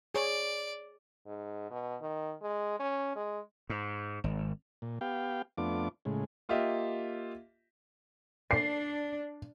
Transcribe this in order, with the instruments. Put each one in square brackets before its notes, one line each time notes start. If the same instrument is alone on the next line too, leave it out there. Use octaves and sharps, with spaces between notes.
[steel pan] G#4 C#5 [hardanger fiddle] D5
[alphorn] G#2
B2
D#3
G#3
C#4
G#3
[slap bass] G#2
G#1
[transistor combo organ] A#2
B3 G4 F5 G5
F2 A3 B3 D4 F4 D6
A2 C#3 G#3
[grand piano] A#3 F4 G4 D#5 E5
[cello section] D4 [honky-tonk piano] C7